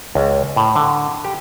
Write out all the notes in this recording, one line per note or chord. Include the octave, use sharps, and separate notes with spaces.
C#2
A2
D3
G4